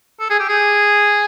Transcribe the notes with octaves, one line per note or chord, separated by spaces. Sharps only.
A4
G#4
G4
G#4